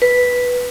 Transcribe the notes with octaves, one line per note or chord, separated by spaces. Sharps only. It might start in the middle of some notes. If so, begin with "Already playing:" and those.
B4